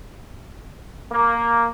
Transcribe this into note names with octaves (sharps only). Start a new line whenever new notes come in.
A#3